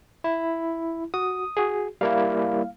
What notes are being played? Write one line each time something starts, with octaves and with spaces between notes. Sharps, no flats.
E4
F#4 D#6
F#4 G#4
G3 A#3 E4 F5